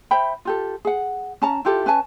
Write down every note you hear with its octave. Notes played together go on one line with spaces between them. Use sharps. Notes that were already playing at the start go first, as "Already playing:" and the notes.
C5 E5 G5 B5
F4 G4 A4
G#4 F#5
C#4 A5 A#5
E4 F4 G4 A4
C#4 B4 G#5 A5